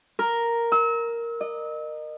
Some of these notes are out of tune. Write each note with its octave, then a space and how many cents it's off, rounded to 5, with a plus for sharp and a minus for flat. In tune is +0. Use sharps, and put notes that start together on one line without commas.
A#4 +0
E6 -35
D#5 -30